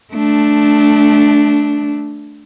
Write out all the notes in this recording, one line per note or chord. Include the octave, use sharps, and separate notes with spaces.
A3 D4